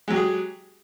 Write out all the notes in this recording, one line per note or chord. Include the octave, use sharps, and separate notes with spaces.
F#3 G#3 G4 G#4